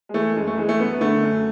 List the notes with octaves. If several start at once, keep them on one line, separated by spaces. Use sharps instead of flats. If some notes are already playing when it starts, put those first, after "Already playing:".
G#3
E3 A3
F#2 G#3
A3
E3 G#3
A3
F#2 B3
D3 A3
F#2